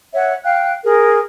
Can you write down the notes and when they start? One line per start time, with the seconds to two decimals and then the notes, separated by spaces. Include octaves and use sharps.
0.14 C#5 E5 F#5
0.44 F5 G5 F#6
0.84 G#4 A#4